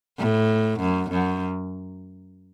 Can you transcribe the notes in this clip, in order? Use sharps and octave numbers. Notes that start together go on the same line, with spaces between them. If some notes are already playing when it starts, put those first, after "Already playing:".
A2
F#2
F#2